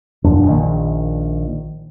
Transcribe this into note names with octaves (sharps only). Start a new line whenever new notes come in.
E1 F#2 F3 D4
A#1 D#3 A#3